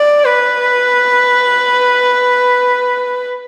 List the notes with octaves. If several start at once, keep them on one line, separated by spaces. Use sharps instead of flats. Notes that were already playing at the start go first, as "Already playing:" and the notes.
Already playing: D5
B4